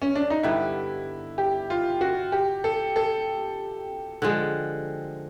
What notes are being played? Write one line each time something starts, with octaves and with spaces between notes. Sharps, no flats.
C#4
D4
D#4
G2 D3 G3 B3 E4
G4
F4
F#4
G4
A4
A4
D3 F3 G#3